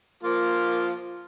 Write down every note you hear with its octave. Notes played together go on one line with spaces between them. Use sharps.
F3 A#3 F4